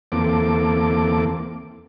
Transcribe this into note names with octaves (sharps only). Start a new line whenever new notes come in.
E2 A#3 C4 A4 D6